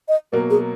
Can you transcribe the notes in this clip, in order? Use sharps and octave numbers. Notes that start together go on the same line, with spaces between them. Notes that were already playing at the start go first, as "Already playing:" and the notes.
D#5
B2 F#3 A#3 A#4
G#4